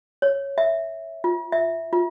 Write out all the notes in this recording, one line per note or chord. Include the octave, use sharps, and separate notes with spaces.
C#5
E5
F4
E5
F4